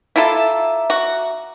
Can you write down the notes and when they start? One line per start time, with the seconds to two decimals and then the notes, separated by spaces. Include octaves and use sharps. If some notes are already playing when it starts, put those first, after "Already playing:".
0.16 E4 F4 A4 E5 A#5 D6
0.90 F#4